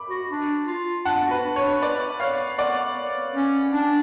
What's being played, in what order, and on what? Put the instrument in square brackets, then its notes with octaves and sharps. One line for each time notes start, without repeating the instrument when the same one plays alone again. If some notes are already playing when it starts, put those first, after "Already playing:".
Already playing: [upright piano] B5 D6
[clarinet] F#4
D4
F4
[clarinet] D4 [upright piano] F#5 A5
[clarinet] F#4
[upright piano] B4
[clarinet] D4
[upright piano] C#5
[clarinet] D4
[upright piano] B4 D5
C#5 F5
D5 F#5
[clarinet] C#4
D4